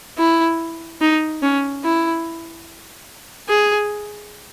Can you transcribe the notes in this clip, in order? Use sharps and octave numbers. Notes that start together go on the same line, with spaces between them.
E4
D#4
C#4
E4
G#4